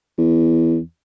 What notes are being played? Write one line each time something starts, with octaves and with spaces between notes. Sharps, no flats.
E2